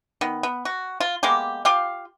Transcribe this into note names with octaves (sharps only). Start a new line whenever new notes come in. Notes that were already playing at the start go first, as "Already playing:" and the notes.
D#3 B3
B3
F#4
F4
G#3 A#3 B3 G4
F4 G4 F5